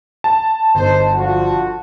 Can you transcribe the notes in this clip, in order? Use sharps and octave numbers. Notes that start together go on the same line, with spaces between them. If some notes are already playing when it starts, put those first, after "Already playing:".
A5
G1 D#4 C5
D3 F3 F#4